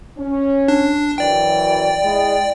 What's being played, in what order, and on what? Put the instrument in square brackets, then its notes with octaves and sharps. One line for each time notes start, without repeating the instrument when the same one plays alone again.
[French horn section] C#4
[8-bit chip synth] D4
[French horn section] F#2 E3 [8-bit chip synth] D5 G5
[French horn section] G#3 E4